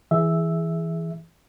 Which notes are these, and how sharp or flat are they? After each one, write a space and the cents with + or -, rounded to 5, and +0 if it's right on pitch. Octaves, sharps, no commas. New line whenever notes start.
E3 +0 G#4 +0 E5 +0